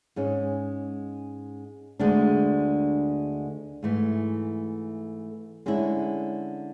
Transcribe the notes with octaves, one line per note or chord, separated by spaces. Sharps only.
G#2 G#3 C#4
D2 D3 G#3 D4
G#2 E3 A3 E4
D3 G#3 C#4 E4